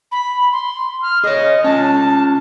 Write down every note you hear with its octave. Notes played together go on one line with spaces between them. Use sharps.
B5
C6
F6
G#4 C#5 D#5
C#4 F4 A5